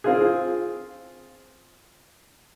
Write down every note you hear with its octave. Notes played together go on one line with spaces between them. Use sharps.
C4 F4 G#4